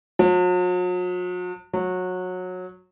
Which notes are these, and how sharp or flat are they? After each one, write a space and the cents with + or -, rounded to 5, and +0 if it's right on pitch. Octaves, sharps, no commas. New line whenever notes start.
F#3 -45
F#3 -20